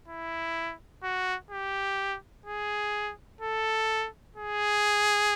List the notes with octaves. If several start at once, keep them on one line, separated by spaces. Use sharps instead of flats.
E4
F#4
G4
G#4
A4
G#4